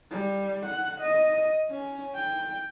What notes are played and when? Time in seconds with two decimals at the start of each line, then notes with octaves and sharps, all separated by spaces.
0.11 G3
0.66 F#5
1.01 D#5
1.70 C#4
2.15 G5